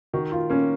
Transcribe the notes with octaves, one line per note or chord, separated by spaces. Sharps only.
D#3 F#4
F4
A#3 C#4